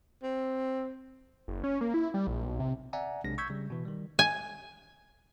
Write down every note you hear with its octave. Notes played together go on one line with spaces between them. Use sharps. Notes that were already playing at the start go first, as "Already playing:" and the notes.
C4
F#1
C#4
A#3
E4
G3
A#1
B1
C3
D5 E5 F#5 G#5 A#5
B1 C3 G#3 D4 A#6
C#6 E6 G6 G#6 B6
C#3 G3
B2 E3
D#3 G3
G#5